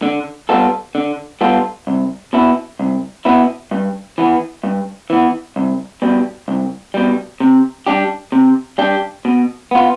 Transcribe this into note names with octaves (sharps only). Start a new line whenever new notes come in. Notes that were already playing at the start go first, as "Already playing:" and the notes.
D3
G3 B3 F4 A4
D3
G3 B3 F4 A4
C2
B2 B3 E4
C2
B2 B3 E4
G2
E3 B3
G2
E3 B3
C2
B2 G3
C2
B2 G3
C3
G3 D4 G4
C3
G3 D4 G4
B2
B3 F4